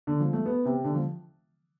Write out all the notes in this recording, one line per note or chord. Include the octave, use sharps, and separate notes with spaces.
D3
F3
A3
B3
C3
D3
F3